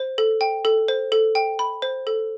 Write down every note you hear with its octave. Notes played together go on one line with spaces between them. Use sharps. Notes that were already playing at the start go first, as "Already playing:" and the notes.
Already playing: C5
A4
G5
A4
C5
A4
G5
B5
C5
A4